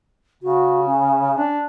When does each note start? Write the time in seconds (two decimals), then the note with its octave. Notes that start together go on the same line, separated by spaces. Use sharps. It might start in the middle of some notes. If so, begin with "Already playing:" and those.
0.43 C#3 F#4
0.86 C#4
1.37 D4